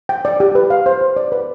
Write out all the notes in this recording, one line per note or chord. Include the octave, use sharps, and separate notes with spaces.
G5
D5
G4
B4
F5
C5
C5
D5
B4